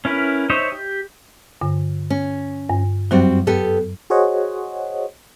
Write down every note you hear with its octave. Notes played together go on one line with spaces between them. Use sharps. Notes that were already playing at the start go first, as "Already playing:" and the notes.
C#4 E4 A#4 B4
D#4 C5 C#5 D#5 E5
G4
G2 D3
C#4
G2
F#2 F#3 G3 C4 F#4
B3 G4 A4
F#4 G#4 C5 C#5 D#5 F#5